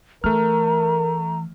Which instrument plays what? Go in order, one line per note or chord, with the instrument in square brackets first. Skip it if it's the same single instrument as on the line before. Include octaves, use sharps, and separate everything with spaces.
[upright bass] E3 [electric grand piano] A3 F6 [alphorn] A#4 [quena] A#5